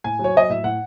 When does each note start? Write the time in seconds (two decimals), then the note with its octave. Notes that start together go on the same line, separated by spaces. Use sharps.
0.04 A2 G#5
0.19 F#3
0.24 C#5
0.35 F#3 D#5
0.49 A2 E5
0.64 A2 F#5